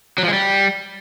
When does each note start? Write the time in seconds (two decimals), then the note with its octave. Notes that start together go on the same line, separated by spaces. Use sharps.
0.18 F#3
0.23 F3
0.28 G#3
0.33 G3